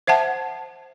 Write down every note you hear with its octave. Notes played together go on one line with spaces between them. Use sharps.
C5 E5 F#5 A5